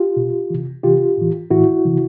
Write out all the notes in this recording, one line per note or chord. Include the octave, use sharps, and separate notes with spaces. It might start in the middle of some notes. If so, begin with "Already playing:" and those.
Already playing: F4 G4
B2
C3 E3
C3 E3 F4 G4
A2 E3
A2 E3 E4 F#4
C3 E3